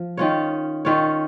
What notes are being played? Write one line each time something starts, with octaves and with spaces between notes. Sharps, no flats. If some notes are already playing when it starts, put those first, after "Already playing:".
Already playing: F3
D#3 C#4 F4 C#5
D#3 C#4 F4 C#5